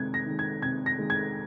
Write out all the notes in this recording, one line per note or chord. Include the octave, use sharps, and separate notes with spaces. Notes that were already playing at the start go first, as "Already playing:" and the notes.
Already playing: C3 D#3 G#3 G#6
A#6
D#3 G#3
G#6
C3 G#6
A#6
D#3 G#3
G#6